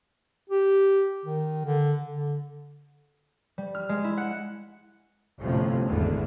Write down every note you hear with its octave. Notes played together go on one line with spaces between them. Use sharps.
G4
D#3
D3
D3
G3
F6
G#3
E4
F#5
G1 F2 A2 C3 F3 C#4
G#1 E2 D3 E3